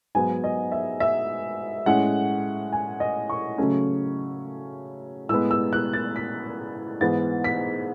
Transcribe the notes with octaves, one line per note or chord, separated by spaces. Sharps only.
G#2 F#3 B3 G#5
D#5
E5
E5
A2 G#3 C#4 F#5
G#5
D#5
C#6
C#3 F#3 A3 C#4
A2 G#3 B3 E6
E6
F#6
A6
B6
G#2 E3 B3 A6
B6